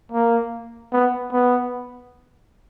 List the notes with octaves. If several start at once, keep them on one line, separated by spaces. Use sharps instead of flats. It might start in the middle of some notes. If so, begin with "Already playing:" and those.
A#3
B3
B3